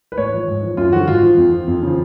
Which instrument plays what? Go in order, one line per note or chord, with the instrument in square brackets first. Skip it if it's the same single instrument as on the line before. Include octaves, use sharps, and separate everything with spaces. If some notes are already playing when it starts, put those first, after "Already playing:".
[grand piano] B4
A2 C#5
F3
G#2
F3
F#2 F4
D3 F3 F#4
G#2 F4
F3
F2
F3
F2
C#3 F3